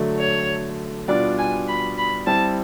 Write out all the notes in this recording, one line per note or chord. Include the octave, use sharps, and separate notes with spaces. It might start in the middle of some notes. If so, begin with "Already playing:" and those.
Already playing: D3 F#3 A3
C#5
B2 G3 B3 D4 F4 D5
G#5
B5
B5
G3 C4 E4 A5